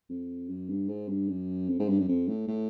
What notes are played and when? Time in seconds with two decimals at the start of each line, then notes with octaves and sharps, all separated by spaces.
0.10 F2
0.49 F#2
0.69 G2
0.89 G#2
1.08 G2
1.28 F#2
1.69 F2
1.79 G#2
1.88 G2
1.98 F#2
2.08 F2
2.28 A2
2.48 A2